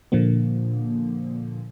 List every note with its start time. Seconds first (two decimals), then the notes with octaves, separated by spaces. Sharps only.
0.12 A#2 D3 F3 A#3